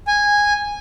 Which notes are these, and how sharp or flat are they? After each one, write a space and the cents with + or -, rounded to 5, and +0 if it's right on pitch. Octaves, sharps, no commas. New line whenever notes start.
G#5 -10